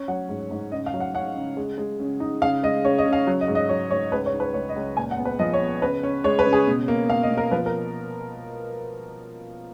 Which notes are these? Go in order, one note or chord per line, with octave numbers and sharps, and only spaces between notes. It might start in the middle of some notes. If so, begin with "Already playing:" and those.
Already playing: C#4
F#3 F#5
G#2
G#2
C#3 D#5
F5
F#3
F#5
C#4 F#5
C#3
G#3
G#3
C#3
D#4
C#3 F5
G#3 D#5
C#3 C#5
D#5
C#3
F5
F#3
D#5
G#2
D#5
F#3 C#5
G#2 C#5
C#2 B4
C#5
D#4
B4
C#2 C#5
D#5
C#2
A#2 G#5
F#5
B3
B4
F3 D#5
C#5
B3
C#3 B4
C#4
G#3 C#5
B4
C#3
G#4
B2
A#3
B2 F5
D#5
B2
A#4
F3 B4
A#4